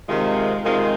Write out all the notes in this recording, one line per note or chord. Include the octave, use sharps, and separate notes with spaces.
C3 D#3 G#3 C4 F4
C3 D#3 G#3 C4 F4